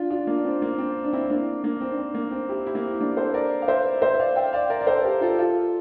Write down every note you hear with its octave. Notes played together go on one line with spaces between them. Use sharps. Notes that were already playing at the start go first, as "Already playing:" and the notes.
Already playing: D4 F4
D4 F4
A#3 D4
D4
C4
A#3
C4
D4
C4 E4
A#3 D4
A#3 D4
C4
D4
C4
A#3
C4
E4 G4
E4 G4
A#3
C4
A#3 D4
A4 C5
A#4 D5
F5
C5 E5
C5 E5
E5
D5 F5
E5 G5
D5 F5
A#4 D5
D5
A4 C5
G4 A#4
F4 A4
F4 A4